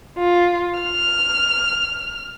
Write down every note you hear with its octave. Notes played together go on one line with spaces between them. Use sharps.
F4
F6